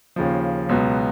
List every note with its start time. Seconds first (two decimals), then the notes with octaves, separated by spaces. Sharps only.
0.16 D#2 C#3 F3
0.69 C#2 B2 F#3 B3